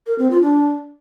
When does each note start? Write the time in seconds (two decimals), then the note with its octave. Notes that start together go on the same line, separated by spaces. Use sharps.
0.07 A#4
0.18 C4
0.30 F4
0.42 D4